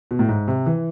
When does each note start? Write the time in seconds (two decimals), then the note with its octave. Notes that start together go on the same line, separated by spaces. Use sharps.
0.11 B2
0.19 A2
0.29 G#2
0.48 C3
0.66 E3